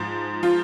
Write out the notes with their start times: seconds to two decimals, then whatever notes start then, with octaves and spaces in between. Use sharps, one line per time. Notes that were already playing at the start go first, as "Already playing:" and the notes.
Already playing: G#2 F3
0.43 F3 F4